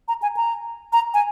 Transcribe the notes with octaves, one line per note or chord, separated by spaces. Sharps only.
A#5
G#5
A#5
A#5
G#5